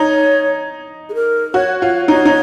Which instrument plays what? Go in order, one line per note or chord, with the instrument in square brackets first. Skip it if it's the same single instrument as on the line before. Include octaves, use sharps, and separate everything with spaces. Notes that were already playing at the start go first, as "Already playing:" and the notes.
Already playing: [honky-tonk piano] D#4 [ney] C#5
[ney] G#4
A#4
[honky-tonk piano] F#4 [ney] C#5
[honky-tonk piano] F4 [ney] C#5
[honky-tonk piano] D#4 [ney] C#5
[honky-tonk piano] D#4